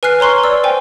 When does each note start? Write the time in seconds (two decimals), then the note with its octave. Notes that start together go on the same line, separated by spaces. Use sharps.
0.03 B4 G#5 F6 F#6 C7
0.20 C#5 A#5 C6 C#6 F6
0.44 D5 E6
0.64 C5 G5 G#5